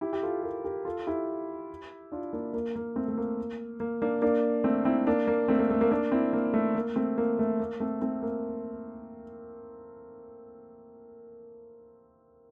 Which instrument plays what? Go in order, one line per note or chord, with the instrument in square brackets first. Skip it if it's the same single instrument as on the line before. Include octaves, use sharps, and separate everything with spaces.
[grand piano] E4 G4
G4
F4 A4
G4 A#4
G4 A#4
F4 A4
E4 G4
D4 F4
A#3 D4
A#3
A#3
A3 C4
A3
A#3
A#3
A#3 D4
A#3 D4
A3 C4
C4 E4
A#3 D4
A#3
A3 C4
A#3
A3
A#3
A#3 D4
C4 E4
A#3
A3
A#3
A3 C4
A#3
A3
A#3
A3 C4
A3 C4
A#3